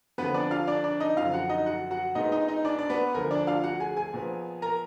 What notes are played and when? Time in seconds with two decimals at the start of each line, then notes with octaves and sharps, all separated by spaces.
0.18 F2 D3 F3 B3 B4
0.34 D4 D5
0.51 F4 F5
0.67 D4 D5
0.84 D4 D5
1.00 D#4 D#5
1.17 F#2 D3 F3 F4 F5
1.33 F#4 F#5
1.49 D#4 D#5
1.66 F#4 F#5
1.91 F#4 F#5
2.15 A#2 G#3 B3 D#4 D#5
2.32 D#4 D#5
2.48 D#4 D#5
2.65 D4 D5
2.79 D5
2.89 B3 B4
3.14 D2 D3 F3 A#4
3.31 D4 D5
3.47 F4 F5
3.64 F#4 F#5
3.80 G#4 G#5
3.97 G#4 G#5
4.13 A#2 F3 B3
4.62 A#4 A#5